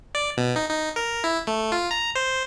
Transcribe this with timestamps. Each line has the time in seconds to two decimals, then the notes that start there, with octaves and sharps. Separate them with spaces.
0.15 D5
0.37 B2
0.56 D#4
0.71 D#4
0.96 A#4
1.24 E4
1.47 A3
1.72 F4
1.91 A#5
2.15 C5